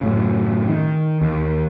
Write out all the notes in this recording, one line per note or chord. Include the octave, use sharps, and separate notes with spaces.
F#2 A2 C#3
D#3
D#2